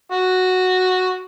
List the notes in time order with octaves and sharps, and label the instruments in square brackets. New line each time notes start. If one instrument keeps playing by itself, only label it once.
[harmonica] F#4